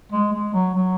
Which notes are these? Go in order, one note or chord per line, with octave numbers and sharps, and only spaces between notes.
G#3
G#3
F#3
F#3